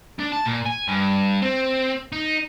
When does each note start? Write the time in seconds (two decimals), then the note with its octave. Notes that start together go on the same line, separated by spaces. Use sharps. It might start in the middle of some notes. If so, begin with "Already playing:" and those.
0.19 D4
0.32 A5
0.45 A#2
0.65 G#5
0.88 G2
1.42 C4
2.12 D#4